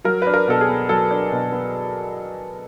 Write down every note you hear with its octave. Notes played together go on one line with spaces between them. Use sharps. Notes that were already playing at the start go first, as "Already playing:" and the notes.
F#3 A#4
D4 B4
A#4
B2 A4
G#4
B3
F#3 A4
D4
B2
B3